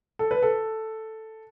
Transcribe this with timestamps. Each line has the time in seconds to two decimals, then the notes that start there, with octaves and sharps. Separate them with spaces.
0.19 A4
0.31 B4
0.43 A4